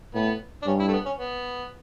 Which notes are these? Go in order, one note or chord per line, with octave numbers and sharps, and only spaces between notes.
A2 B3
D4
G2 C#4
E4
A3
B3
C#4
B3